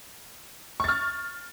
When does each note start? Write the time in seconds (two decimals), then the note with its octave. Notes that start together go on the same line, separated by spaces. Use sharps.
0.80 C#6
0.84 A6
0.88 F6